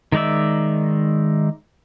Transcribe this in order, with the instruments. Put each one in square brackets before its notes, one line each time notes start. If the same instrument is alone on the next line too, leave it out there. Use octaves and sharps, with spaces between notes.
[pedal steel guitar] D#3 G#3 D#4 D5 E5